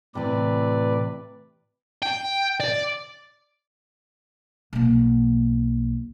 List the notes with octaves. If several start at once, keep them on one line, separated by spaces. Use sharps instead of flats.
A2 C3 E3 B4 D5
G5
D5
B1 A#3